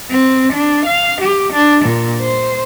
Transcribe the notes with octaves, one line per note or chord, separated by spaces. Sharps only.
C4
D4
F5
G4
D4
A#2
C5